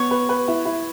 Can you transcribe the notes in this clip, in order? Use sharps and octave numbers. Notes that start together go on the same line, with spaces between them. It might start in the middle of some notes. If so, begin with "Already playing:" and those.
Already playing: B3 C#5
B4
B4
E4
E4